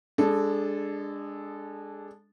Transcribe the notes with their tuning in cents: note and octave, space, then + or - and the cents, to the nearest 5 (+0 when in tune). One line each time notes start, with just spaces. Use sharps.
G#3 -25 D4 +0 A4 -15